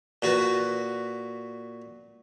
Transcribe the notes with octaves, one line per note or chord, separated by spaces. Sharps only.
A#2 F#4 B4